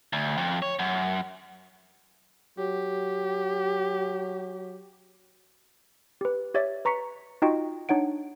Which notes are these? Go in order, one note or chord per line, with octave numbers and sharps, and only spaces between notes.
D2
F2
C#5
F#2
F#3 G4
G4 B4
G4 C#5 D5 E5 A6
B4 A#5 C#6 B6 C#7
D#4 F4 F#4 D#5 G5 C#6
D4 D#4 C#5 F#5 D7